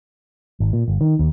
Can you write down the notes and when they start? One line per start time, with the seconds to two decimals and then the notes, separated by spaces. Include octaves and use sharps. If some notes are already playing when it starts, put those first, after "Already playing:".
0.60 G#1
0.73 A#2
0.88 G1
1.01 D#3
1.19 D#2